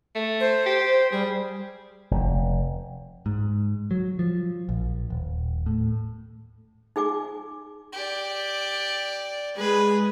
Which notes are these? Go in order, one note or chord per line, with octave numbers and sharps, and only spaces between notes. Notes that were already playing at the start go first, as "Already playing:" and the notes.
A3
C5
G4
G3 G#4
F1
G#2
F#3
F3
A#1
D#1
A2
D#4 G#4 G#5 D6
G4 D5
G#3 G#4 B4